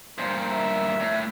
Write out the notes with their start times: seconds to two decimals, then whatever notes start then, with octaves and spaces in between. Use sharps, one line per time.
0.18 G2 A#2 C5
0.50 E5
1.00 A2